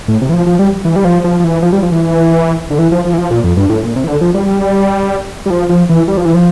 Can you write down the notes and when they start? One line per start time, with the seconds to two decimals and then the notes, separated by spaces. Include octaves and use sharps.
0.08 A2
0.22 C3
0.29 E3
0.33 F3
0.46 F3
0.59 G3
0.85 E3
0.96 G3
1.05 F3
1.24 F3
1.40 F3
1.44 E3
1.62 F3
1.72 G3
1.83 F3
1.92 E3
2.70 D3
2.79 E3
2.92 F3
3.05 F3
3.13 E3
3.18 F3
3.31 A#2
3.44 F2
3.57 G2
3.69 A2
3.83 A#2
3.96 C3
4.04 E3
4.08 D3
4.21 F3
4.34 G3
5.46 G3
5.50 F3
5.69 F3
5.90 E3
6.08 G3
6.17 F3
6.25 E3
6.35 F3